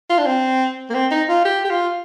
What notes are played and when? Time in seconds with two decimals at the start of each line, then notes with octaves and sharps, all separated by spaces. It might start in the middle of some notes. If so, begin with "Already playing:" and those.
0.10 F4
0.18 D4
0.26 C4
0.90 A#3
0.94 C4
1.11 D#4
1.29 F4
1.45 G4
1.65 G4
1.71 F4